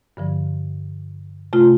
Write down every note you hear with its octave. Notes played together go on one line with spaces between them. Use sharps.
G2 D3 F3
C3 A3 F4